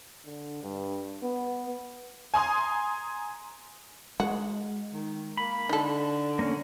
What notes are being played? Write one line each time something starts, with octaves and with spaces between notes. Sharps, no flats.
D3
G2
B3
G#5 A#5 C6 D#6
G#3 F#4
D#3
A#3 B5
D3 D#4 A4
A#3 C#4